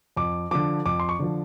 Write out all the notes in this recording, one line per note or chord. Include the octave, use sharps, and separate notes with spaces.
F2 D6
D3 F3 D6
F2 D6
C6
C#6
D3 F3